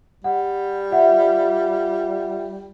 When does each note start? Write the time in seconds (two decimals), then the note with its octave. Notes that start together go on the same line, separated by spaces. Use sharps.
0.24 G3 F#5
0.92 F4 E5 F#5